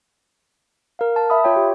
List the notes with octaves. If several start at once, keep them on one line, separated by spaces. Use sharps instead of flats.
A#4 F5
A5
E5 B5 D#6
F4 C#5 G5
G4